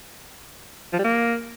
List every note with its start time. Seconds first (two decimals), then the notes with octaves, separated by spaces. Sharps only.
0.93 F3
0.98 G3
1.04 A#3